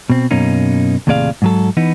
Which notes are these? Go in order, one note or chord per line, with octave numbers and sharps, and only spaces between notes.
B2 C4
F#2 B2 A#3 C#4 D#4
D#2 A2 C3 G#4 D5 F5
G#2 F#3 A4
E3 B3 D#4